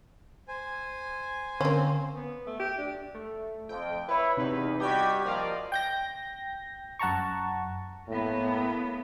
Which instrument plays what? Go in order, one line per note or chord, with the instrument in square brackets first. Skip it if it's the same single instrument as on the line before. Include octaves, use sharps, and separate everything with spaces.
[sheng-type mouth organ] C5 G#5
[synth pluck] D3 [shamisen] A#3 C#4 [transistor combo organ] C4
[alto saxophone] B3
A3
G4
D4
[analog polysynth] A3
[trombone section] F2 [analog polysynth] G5
[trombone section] E4 [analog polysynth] B4 C#5
[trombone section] E2 [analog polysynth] C3 D#4 B4
[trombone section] G3 F#4 G4 [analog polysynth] D#5 G#6 B6
[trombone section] F3 A#3 [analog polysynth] D5 D#5 F5
[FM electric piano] G5 G6 A#6
F#2 F#5 A5 A#5 C#6
[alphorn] A2 [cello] A#3 B3